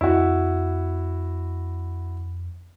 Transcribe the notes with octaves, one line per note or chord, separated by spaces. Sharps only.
F2 E4 F#4